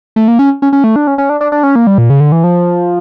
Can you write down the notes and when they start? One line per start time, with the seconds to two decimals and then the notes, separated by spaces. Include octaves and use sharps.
0.16 A3
0.28 A#3
0.39 C#4
0.62 C#4
0.73 C#4
0.84 A3
0.96 D4
1.07 C#4
1.18 C#4
1.30 D4
1.41 D4
1.52 D4
1.63 C#4
1.76 A#3
1.87 G3
1.98 A#2
2.10 C#3
2.20 D3
2.32 E3
2.44 F3